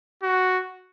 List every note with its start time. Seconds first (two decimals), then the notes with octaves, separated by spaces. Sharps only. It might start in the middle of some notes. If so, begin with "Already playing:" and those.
0.23 F#4